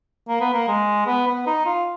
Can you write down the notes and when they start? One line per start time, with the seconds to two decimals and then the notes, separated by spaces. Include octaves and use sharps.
0.28 A#3
0.41 B3
0.53 A#3
0.68 G#3
1.07 B3
1.27 B3
1.47 D#4
1.66 F4